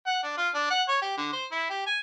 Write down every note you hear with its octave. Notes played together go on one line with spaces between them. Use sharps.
F#5
D4
F4
D4
F#5
C#5
G4
D3
C5
E4
G4
G#5